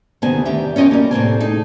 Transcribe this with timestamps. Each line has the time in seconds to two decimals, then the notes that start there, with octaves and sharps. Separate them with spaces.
0.22 D2 C3 D#3 B3 C5 G#5
0.45 E2 D#3 G3 G4 E5
0.76 C#4 F4 D#5 G5 G#5
0.91 G3 A#3
1.11 A2 C3 C4 G#5
1.40 D#4 G#4